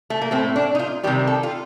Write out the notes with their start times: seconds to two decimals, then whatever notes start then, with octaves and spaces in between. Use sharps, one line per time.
0.10 A3
0.21 A#3
0.31 A2 A3 C4
0.56 D4
0.75 D#4
0.79 F4
1.03 C3 D#3 G3 G4
1.27 A4
1.43 F4